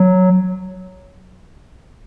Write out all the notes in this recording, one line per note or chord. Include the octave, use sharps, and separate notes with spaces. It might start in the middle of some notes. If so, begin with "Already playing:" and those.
Already playing: F#3